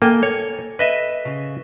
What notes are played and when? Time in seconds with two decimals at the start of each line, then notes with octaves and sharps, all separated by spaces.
0.02 A#3 A4 G5 G#5
0.23 C#5
0.79 B4 D#5 E5
1.25 C#3